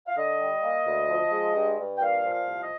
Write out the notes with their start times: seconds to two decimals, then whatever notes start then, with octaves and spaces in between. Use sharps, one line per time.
0.07 F5
0.16 D3 D#5
0.39 G3
0.63 A#3
0.86 D2
1.09 F3
1.32 G#3
1.55 G2
1.78 G2
1.98 G5
2.01 A#2 F5
2.25 F3
2.32 F5
2.48 C2
2.63 D#5